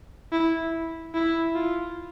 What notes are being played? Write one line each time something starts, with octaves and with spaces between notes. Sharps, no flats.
E4
E4
F4